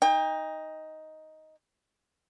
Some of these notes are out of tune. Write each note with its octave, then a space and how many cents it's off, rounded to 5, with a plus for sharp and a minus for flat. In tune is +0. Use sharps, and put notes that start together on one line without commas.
D#4 +10 G5 +40